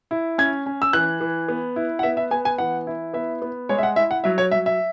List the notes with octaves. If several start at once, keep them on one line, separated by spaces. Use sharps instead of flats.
E4
C#4 G#6
C#4
E6
E3 F#6
E3
B3
E4
F#5
B3 E5
E5
B3 G#5
G#5
E3 F#5
E4
B3 E5
B3
G#3 C#5
E5
F#5
E4 E5
F#5
F#3 E5
C#5
F#3 E5
E5